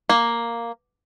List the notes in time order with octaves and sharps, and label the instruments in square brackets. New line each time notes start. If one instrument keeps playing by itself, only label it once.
[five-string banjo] A#3